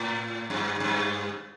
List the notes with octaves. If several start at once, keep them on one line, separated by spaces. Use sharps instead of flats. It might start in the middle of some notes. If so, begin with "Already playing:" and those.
Already playing: A2
G2
G2